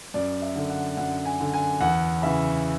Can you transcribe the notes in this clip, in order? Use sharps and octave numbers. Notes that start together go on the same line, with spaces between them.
F#2 D5
E5
D3
F#5
F#2 F#5
G#5
D3
G#5
E2 F#5
C#3 E3 E5